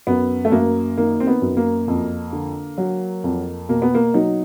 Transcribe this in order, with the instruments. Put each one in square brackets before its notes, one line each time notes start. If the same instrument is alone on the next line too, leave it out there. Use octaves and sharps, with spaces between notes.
[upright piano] F#2 B3
A3
F#2 A#3
D#3 A#3
C4
B3
F#2
A#3
F2
D3
F#3
F2
B2 A#3
B3
A#3
F#3 D#4